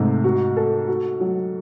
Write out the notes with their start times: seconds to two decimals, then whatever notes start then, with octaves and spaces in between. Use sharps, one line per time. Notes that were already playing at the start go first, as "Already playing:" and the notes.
Already playing: G#2 C3 A3
0.24 F#4
0.57 A4
0.88 F#4
1.21 F#3